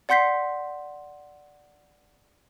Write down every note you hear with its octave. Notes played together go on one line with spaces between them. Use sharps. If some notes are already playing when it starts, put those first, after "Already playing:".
D5 F#5 C6 G6 B6 C7